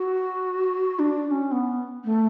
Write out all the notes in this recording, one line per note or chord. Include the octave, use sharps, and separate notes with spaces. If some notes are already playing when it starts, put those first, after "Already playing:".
Already playing: F#4
D4
D4
C#4
B3
A3